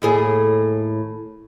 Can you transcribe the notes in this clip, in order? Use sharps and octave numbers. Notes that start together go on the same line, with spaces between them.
D#2 A2 G#4